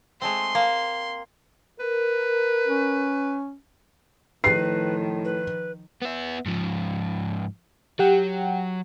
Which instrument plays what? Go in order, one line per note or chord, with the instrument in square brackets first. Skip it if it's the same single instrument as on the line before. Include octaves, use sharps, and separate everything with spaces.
[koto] G#3 A3 C4 [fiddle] C6
[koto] A#3
[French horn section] A#4 [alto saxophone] B4
[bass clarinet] C#4
[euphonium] A2 [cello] D#3 F3 [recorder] B4 [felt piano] C7
[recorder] B4
[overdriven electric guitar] B3 E5
G#2 F3
[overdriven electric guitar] F#3 [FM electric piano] G4 F#5 G5